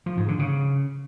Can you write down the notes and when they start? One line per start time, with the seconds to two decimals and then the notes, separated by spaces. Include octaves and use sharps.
0.06 F3
0.17 G#2
0.28 D3
0.39 C#3